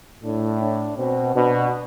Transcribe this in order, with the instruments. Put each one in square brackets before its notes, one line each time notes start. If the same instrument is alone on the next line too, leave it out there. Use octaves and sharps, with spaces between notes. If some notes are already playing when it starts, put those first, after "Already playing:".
[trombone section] A2 [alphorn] D4
[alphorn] D4
[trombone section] B2 [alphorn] C4
[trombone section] B2 [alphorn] D4